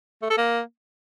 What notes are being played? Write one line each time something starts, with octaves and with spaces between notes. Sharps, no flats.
A3
A4
A#3